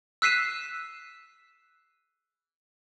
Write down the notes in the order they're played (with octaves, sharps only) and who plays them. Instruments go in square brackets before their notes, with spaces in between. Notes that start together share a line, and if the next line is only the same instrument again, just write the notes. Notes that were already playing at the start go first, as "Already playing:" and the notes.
[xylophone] E6 F#6 B6 C7 D#7 E7